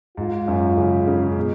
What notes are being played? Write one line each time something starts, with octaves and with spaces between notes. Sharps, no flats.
G#2 F4
F#2
C#3
C#3
B2